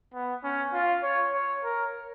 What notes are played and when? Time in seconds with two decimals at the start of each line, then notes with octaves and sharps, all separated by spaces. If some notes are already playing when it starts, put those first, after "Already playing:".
0.14 B3
0.43 C#4
0.73 F4
1.03 C#5
1.33 C#5
1.64 A#4